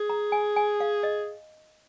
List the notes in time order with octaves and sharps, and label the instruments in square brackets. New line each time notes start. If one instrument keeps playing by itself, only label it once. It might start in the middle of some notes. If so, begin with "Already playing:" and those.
Already playing: [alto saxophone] G#4
[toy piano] A#5
G#5
G#5
F5
D#5